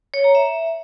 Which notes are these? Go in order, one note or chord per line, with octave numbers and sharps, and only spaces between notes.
C#5
A#5
E5